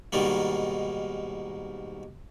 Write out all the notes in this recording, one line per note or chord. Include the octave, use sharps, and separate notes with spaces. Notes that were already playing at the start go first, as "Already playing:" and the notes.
G#2 B2 D#3 G3 A#3